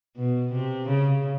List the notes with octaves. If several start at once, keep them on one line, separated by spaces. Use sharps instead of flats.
B2
C3
C#3